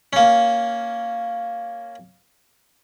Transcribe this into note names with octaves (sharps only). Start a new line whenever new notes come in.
A#3 C#4